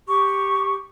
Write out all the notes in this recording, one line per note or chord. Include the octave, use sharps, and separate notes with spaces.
G4 C#6